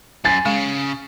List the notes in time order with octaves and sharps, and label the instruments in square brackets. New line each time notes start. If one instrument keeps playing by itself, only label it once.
[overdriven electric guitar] F#2 [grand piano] G#5 A6
[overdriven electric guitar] C#3 [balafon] G#3 F5